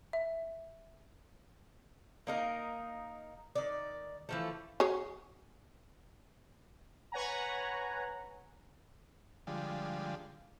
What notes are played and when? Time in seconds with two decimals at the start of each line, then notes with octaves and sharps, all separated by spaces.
0.13 E5
2.27 A#3 D#4 A#4
3.55 D#3 D5
4.29 E3 F3 A3
4.80 F#4 G#4 C#5
7.12 B4 C#5 F#5 G#5 A#5
9.47 D3 F3 G3 G#3